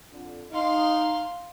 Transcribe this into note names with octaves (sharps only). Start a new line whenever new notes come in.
F2 D3
D#4 F5 C6